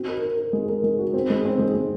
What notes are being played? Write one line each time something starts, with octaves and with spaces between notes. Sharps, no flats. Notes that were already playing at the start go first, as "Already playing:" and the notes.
Already playing: C4 F#4
A#4
A#4
A#4
G#3
A#4
G#3
F#4
C4
G#3
C4
G#3
G#3